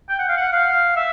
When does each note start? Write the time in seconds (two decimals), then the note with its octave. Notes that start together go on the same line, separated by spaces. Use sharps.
0.09 G5
0.19 F#5
0.28 F5
0.37 F#5
0.53 F5
0.97 E5